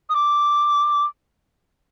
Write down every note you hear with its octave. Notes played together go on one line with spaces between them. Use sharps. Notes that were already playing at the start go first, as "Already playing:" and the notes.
D#6
D6